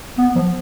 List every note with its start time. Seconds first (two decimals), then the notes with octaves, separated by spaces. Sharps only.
0.18 B3
0.35 F3